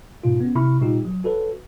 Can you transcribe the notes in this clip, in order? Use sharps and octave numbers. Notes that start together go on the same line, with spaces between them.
G#2 B2 F4
B3 C#4 F#4
C3 E4 B5 C#6 F6
A#2 G3 D#4 F4 G4
F#3
F#4 A4 B4 C#5